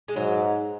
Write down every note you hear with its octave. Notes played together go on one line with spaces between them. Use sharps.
G#3
G#2 F#3